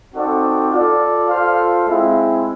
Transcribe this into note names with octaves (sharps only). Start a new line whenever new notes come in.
C4 D#4 F#4 A4 D5
F4 A4 D5
F4 A4 C5 F5
G#3 C4 E4